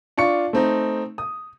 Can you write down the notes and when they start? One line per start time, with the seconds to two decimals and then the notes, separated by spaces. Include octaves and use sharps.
0.17 D4 F4 C#6 C#7
0.53 A3 C4 D#4
1.18 D#6